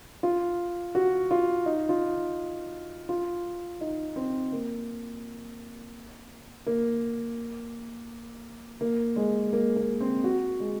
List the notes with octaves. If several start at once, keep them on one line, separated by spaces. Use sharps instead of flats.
F4
F#4
F4
D#4
F4
F4
D#4
C4
A#3
A#3
A#3
G#3
A#3
A#3
C4
F#4
G#3